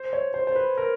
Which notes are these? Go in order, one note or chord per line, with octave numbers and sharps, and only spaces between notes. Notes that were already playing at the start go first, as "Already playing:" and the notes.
Already playing: C5
C#5
C5
C5
B4
A#4